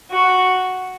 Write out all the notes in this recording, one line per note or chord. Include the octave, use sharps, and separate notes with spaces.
F#4